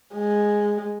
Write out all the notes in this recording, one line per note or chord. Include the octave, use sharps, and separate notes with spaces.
G#3